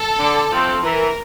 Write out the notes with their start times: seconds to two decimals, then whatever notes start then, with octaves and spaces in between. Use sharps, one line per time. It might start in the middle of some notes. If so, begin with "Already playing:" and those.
Already playing: A4
0.19 D3
0.52 F3 A3 C4
0.83 E3 A#4